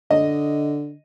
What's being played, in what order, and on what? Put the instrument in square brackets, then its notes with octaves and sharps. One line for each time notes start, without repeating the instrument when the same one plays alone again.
[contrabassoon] D3 [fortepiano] D#5